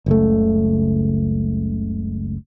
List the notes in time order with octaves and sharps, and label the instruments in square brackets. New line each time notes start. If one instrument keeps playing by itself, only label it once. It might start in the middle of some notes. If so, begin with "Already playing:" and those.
[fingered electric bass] F#1 C#2 A3